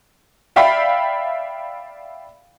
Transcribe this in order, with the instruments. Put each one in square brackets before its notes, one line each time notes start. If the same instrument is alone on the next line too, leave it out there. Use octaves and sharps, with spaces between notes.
[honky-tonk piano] D5 E5 F5 G5 B5